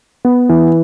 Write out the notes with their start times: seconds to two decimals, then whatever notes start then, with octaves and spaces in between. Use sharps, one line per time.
0.25 B3
0.49 E3